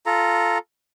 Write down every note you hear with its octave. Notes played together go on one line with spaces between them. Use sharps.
F4 A4 A#5